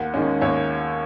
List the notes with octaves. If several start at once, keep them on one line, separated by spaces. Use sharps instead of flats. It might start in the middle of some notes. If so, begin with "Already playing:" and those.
Already playing: D#2 F#5
D#3 G#3 C#4
D#2 C#5 E5